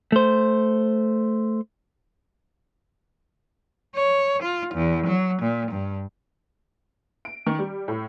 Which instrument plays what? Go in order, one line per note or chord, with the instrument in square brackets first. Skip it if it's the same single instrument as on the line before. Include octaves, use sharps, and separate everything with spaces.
[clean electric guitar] A3 C5
[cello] C#5
F4
E2
F#3
A#2
G2
[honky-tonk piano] D7
D#3
G3
A2